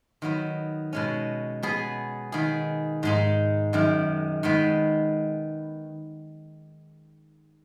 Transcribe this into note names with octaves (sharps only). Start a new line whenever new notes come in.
D#3 F#3 B3
B2 G#3 C#4
B2 B3 G#4
D#3 B3 G#4
G#2 G#3 D#4
F#2 D#3 G#3
D#3 G#3 B3